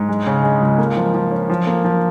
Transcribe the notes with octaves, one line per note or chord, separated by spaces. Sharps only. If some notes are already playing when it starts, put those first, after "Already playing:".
Already playing: G#2
G#3
C#3
G#3
C#2
A#3
F3
F3
C#4
F3
A#3
F3